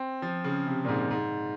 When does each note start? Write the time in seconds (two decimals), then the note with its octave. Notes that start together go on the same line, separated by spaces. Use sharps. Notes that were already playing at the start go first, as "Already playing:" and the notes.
Already playing: C4
0.22 F3
0.44 C#3
0.66 C3
0.84 A#2
0.88 G#2
1.11 G#2